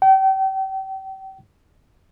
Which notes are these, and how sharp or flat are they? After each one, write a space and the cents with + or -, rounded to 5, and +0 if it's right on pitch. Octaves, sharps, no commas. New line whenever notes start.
G5 -35